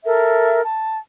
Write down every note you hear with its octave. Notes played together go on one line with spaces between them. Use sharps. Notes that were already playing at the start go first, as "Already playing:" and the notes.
A4 A#4 E5
A5